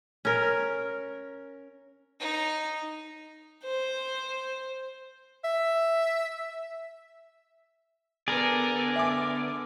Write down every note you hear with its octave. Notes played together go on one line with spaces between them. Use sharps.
C#4 A#4
D#4
C5
E5
D3 B3 G#4 A#4 B4 D5
E5 G#5 D6